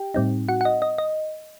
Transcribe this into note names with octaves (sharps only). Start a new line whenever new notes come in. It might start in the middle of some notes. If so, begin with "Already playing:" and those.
Already playing: G4 G5
A2 G3 C4 D#4
F#4 F#5
F#5
D#5
D#5
D#5